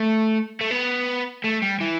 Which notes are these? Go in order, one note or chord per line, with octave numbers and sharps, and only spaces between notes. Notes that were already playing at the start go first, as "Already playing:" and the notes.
Already playing: A3
A3
B3
A3
G3
E3